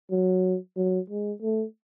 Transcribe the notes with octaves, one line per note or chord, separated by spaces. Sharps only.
F#3
F#3
G#3
A3